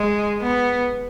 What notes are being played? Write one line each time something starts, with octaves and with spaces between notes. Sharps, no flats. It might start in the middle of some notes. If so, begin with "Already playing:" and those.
Already playing: G#3
B3